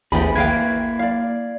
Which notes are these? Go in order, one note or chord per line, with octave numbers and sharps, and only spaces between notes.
A1 D#2 A3 C4 G4 G#4 B5
A#3 E4 B4 F5 G5 G#6
D5 F5